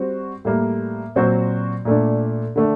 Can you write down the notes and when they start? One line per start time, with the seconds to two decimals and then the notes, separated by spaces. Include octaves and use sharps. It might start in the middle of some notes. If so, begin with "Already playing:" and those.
Already playing: G3 C4 F#4 C5
0.45 A2 G3 A#3
1.16 A#2 F#3 C4 F#4 C5
1.85 A#2 A3 D4
2.56 D3 A3 D4